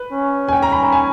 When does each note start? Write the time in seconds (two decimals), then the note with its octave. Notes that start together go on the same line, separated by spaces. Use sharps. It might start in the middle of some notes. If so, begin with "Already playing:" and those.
Already playing: B4
0.13 C#4
0.48 G#5
0.53 G5
0.62 A#5
0.72 B5
0.83 A#5
0.92 G#5